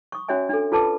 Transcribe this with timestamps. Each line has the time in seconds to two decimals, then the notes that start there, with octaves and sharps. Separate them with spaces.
0.12 C#6 D#6
0.28 C#4 F#4 C#5 E5 G#5
0.49 D4 A4
0.72 F4 A4 B4 A5 D6